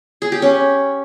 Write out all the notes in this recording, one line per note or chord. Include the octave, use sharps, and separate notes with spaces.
G#4
G4
C#4